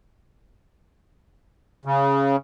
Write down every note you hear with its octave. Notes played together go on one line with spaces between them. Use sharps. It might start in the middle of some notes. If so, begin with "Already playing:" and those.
C#3